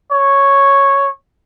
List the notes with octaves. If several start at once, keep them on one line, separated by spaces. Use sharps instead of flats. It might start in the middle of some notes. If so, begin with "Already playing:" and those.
C#5